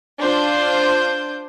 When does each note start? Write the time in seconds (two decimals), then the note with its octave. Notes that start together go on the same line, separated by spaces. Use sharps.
0.20 D4 F4 C5 G6